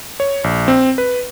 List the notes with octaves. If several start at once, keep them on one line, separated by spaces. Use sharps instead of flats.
C#5
A#1
C4
B4